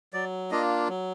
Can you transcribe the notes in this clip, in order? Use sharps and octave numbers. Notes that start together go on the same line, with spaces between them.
F#3 D5
A#3 D4 F4 D#5
F#3